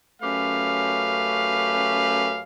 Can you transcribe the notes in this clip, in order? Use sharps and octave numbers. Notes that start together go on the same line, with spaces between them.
F#2 A3 C#4 G4 B4 F5